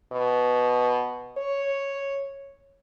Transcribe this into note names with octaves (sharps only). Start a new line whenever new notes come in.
B2
C#5